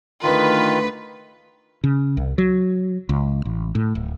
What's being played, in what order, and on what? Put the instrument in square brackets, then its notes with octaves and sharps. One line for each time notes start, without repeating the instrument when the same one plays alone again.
[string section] D2 B4 [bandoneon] D#3 F4
[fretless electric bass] C#3
C2
F#3
C#2
A1
A2
D1